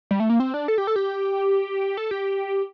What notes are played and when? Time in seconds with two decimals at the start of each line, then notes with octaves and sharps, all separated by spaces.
0.11 G3
0.20 A3
0.30 A#3
0.40 C4
0.54 D4
0.68 A4
0.78 G4
0.87 A4
0.96 G4
1.97 A4
2.11 G4